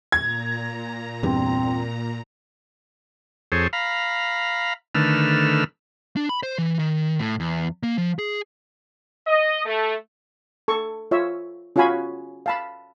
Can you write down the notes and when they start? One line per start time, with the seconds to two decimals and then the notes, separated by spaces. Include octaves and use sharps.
0.12 A#2 A#5 G#6
1.23 E2 G2 C4
3.52 F2 G#4 A4 C5 C#5
3.73 F5 A#5 B5
4.95 D3 D#3 A3 B4 E6 F6
6.17 D4
6.29 B5
6.43 C5
6.58 E3
6.79 D#3
7.19 A2
7.40 E2
7.83 A#3
7.98 F3
8.19 G#4
9.27 D#5
9.66 A3
10.68 A4 C#6
11.11 F4 C#5 E5
11.76 C#4 F4 F#4 F5 G#5 B5
12.46 F5 A5 B5